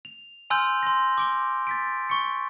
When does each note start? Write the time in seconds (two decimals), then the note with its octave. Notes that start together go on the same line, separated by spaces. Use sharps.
0.05 F7
0.50 G#5 C6 E6 F6 G6 F7
0.83 C6 A#6
1.18 D6 D7 G7
1.67 A6 B6 D7
2.10 C#6 C#7